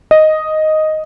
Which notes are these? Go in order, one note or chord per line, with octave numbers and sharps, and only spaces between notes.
D#5